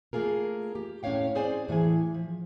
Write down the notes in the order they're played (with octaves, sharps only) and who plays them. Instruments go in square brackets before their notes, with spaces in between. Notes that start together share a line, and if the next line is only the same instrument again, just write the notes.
[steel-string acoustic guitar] A3 A#3 F4 G#4 A#4
G4
A2 C#4 F4 C#5 F5 G5
C4 G#4 C5 D5 G#5
A2 E3 G#4 G#5
F3